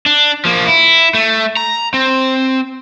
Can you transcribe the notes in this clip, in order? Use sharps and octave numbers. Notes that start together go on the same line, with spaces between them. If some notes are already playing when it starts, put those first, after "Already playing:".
D4
F3 A#3
E4
A3
A#5
C4